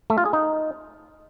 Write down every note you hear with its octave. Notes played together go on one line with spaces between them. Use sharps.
A3
F4
G#4
D#4